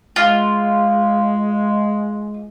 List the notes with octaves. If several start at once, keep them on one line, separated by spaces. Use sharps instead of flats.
G#3 F4